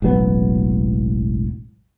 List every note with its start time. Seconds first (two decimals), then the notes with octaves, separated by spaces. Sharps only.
0.02 E1 A1 F#3 B3